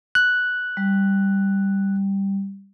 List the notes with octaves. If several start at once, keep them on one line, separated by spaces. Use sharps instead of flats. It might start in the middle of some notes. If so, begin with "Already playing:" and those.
F#6
G3